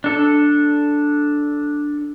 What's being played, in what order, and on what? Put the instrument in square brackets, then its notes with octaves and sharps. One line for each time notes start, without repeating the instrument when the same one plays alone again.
[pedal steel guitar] D4 A4